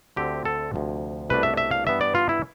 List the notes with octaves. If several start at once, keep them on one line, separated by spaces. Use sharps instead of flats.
D2 D3 A3 C4 G4
A4
D2 C3 F3
C2 B2 A3 D4 B4
E5
E5
F5
G2 E3 B3 E5
D5
F4
E4